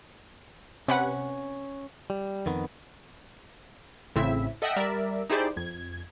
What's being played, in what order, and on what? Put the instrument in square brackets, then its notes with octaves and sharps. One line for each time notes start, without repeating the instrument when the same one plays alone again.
[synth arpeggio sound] C3 B4 F#5 [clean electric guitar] C#4
[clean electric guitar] G3
F2 D#3 B3
[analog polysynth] A1 A2 C#3 C4 E4 E5
A4 D#5 E5 F#5 G5
G3 A#4 D5 E5
D#4 E4 G4 G#4 C5 D5
F2 G#6